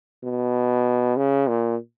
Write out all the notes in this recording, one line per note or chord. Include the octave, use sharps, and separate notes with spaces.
B2
C#3
A#2